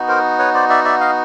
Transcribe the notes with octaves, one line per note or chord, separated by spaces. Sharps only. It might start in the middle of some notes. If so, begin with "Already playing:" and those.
Already playing: B3 D#4 F#4
A#4 C5
B4 C#5
C5 D5
D5 E5
D5 E5
D#5 F5